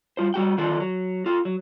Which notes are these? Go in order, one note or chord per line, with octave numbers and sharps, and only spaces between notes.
G3 F4 C5
G3 F#4 G5
D3 D#3 F3 D4 F4 A4
F#3
F4 A4
F#3